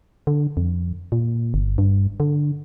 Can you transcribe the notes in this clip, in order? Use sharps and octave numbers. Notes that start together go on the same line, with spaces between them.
D3
F2
A#2
G1
G2
D3